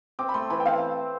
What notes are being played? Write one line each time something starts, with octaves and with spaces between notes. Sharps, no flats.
C4 D6
B5
A3 C6
E3 B5
G5
C4 F5